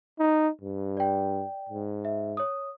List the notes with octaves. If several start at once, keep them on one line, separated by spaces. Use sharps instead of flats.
D#4
G2
D5 G5
G#2
E5
C#5 D#6